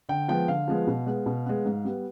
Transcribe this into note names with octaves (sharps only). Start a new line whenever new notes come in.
D3 G5
F3 G#3 B3 G5
D3 F5
F3 G#3 B3
B2
G#3 B3
B2
G#3 B3
G#2
G3 B3